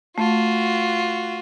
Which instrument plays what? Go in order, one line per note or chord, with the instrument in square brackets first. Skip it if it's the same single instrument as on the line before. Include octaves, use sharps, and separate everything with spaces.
[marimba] A3 [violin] F4 F#4